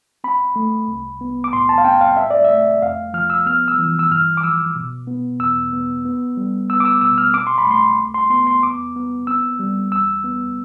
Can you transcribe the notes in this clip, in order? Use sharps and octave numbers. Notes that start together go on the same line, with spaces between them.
C4 B5
A3
C2
B3
D6
A2 C6
A5
F5
C4 G5
F5
C4 E5
D5
E5
A3
F2 F5
F3 F6
E6
B3 F6
E6
E3
E6
G2 F6
D6
F3 E6
B2
B3
E2 E6
B3
B3
G3
B3 E6
D6
E6
B2 E6
F6
C4 D6
C6
B5
A3 C6
C2
C6
B3 C6
C6
E2 D6
B3
C4 E6
G3
E2 E6
B3